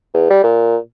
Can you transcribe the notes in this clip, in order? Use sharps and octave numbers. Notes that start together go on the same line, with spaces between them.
E2
G3
A#2